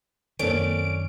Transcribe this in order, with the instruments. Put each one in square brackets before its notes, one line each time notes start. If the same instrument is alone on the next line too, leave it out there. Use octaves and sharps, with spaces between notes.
[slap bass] F#2 D#3 [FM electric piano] A#3 C4 A4 [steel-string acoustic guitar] C#4 D5 [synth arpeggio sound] D7